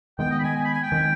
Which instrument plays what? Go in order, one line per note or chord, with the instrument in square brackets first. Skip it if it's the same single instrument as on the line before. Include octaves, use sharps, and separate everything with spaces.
[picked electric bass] D#3 G#3 B3 [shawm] G5
[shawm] D#5
B5
G#5
G#5
B5
G#5
G5
[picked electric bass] D#3 G#3 C4